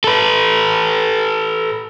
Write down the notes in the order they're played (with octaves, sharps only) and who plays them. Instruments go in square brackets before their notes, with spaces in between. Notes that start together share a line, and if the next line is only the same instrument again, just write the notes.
[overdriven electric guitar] A4 B4